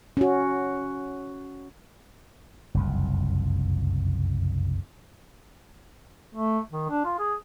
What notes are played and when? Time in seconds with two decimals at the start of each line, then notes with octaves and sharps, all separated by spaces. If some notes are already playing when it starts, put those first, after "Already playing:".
0.17 C#4 F#4
2.74 F#1 C2 F2
6.35 A3
6.72 D#3
6.89 D4
7.05 F4
7.19 G#4